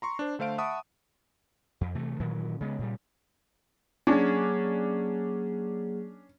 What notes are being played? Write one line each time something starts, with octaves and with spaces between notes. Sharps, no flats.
A#5 C6 C#6
D4 C5
D3 A3 C5 F5 D7
E5 F#5 A5 B5 C#6 D#6
F2
C3 E3 A3
A#2 D#3 E3 F#3
C#3 G#3 B3
A#2 C#3 G3
F#3 A#3 C#4 D4 G#4